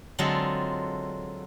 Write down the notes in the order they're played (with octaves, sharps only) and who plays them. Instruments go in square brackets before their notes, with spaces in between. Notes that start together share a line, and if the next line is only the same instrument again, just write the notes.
[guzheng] D3 F#3 G#3 C4 F4 A4